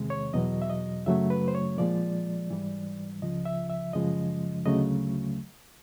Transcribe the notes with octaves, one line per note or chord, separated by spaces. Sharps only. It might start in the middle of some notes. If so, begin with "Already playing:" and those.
Already playing: E2 C3 D#3 G#3
C#5
E2 B2 F#3 D#5
E5
D#5
F#2 C#3 F#3 A3 E5
B4
C5
C#5
A#2 F3 G#3 D5
G#2 E3 G3
C#2 C#3 F3 D#5
E5
E5
F#2 C#3 F3 G#3 D#5
D2 C#3 F#3 A3 D#5